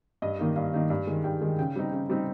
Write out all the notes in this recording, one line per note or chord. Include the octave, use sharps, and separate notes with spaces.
G2 D#5
D#3 A#3 D#4
G2 F5
D#3 A#3 D#4
G2
D#3 G#3
G2 G5
D#3 G#3
C#3 G5
G3 C4 D#4
C#3
G3 C4 D#4